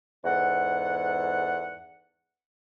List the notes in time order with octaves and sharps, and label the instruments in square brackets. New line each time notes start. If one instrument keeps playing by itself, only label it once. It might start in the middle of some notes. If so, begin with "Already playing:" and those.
[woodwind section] E2 G#2 A4 F#5